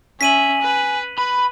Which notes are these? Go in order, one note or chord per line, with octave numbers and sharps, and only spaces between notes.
C#4 E5 G#5 B6 D#7 F#7
B4
B4 B5